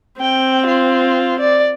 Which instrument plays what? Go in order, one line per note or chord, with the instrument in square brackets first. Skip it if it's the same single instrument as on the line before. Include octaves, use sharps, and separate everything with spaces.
[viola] C4 [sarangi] G5
[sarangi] F4
D5